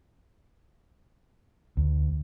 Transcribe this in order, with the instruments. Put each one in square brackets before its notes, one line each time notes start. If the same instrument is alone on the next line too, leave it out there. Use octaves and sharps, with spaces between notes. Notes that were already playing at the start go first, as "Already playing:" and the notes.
[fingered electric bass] D2